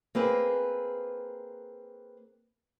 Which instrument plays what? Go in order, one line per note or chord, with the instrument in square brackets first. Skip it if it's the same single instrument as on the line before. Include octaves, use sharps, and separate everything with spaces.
[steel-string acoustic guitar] A#3 C4 G#4 B4